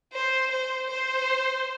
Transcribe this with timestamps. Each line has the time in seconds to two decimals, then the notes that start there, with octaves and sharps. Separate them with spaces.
0.13 C5
0.51 C5
0.89 C5